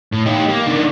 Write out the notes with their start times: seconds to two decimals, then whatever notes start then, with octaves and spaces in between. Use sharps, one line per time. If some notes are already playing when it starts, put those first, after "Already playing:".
0.12 A2
0.26 D#4 G4
0.49 A#3
0.67 D#3 D4